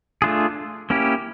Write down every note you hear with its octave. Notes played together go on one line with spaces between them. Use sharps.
A3 D4 F4 G#4
A#3 C#4 E4 G4